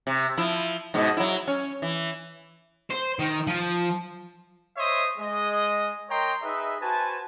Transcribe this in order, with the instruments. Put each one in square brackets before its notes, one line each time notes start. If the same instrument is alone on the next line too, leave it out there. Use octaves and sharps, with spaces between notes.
[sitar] C3
F3 E4
G#2 B2
F#3 E4
C#4
E3
[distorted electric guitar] C5
D#3
F3
[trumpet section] C5 C#5 D#5 E5 C6 D#6
G#3 D#5
A#4 C#5 D#5 G5 A#5 C6
D#4 G#4 B4 D#5 E5
F#4 B4 C5 G#5 A5